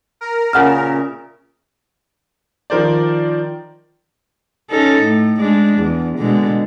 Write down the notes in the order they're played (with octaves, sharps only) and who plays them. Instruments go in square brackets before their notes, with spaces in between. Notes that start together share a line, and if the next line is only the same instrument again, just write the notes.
[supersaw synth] A#4
[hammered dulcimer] A#2 C#3 E5 [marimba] F#5 F6
[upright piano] D#3 F3 A#4 C5 D5
[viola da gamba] C#4 D#4 A4
A2
G#3 D4
E2
B2 D3 G#3